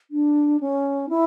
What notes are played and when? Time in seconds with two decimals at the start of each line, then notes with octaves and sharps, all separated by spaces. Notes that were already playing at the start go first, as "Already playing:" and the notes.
0.11 D4
0.60 C#4
1.09 E4